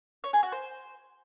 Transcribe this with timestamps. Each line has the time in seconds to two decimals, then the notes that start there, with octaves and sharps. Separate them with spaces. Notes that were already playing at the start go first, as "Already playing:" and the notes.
0.24 C#5
0.33 G#4
0.43 F#4
0.52 C5